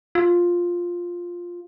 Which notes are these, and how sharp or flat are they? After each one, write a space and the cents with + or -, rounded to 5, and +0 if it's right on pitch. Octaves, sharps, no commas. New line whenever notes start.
F4 +5